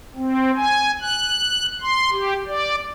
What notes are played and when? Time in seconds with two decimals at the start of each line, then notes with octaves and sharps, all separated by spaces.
0.16 C4
0.56 G#5
1.01 F#6
1.81 C6
2.12 G4
2.47 D5